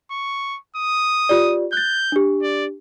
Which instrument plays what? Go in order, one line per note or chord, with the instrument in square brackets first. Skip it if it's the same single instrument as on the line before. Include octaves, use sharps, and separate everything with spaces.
[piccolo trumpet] C#6
D#6
[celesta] F4 G4 D5
[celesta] F#6 A6 [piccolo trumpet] G6
[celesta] D4 G4
[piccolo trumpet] D5